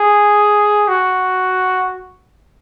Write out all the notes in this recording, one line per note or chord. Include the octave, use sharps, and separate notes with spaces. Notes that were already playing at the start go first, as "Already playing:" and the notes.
Already playing: G#4
F#4